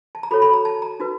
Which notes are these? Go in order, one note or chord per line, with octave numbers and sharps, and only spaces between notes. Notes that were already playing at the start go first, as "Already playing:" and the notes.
A5
A#5
F#4 A4 C#5 B5
B5
A#5
A5
A#5
D#4 F#4 B4